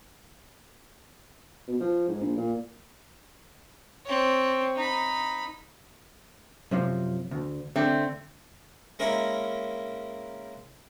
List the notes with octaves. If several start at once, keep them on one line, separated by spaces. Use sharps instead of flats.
B2
F3
G#2
A#1
A#2
C4 C#5
D#4 B5
F#2 C3 F3
D2
D3 A3 C4
G#3 A#3 C#4 E4 A#4 C#5